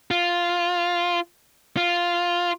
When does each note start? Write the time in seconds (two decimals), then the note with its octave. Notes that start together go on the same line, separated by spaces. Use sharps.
0.11 F4
1.77 F4